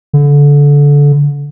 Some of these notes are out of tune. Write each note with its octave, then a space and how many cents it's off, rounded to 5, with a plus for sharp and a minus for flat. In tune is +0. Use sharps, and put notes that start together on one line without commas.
D3 -25